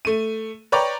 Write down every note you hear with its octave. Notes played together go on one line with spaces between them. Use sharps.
A3 D#7
B4 C#5 D5 G5 A#5